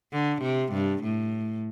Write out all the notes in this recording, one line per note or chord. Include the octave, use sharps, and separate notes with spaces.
D3
C3
G2
A2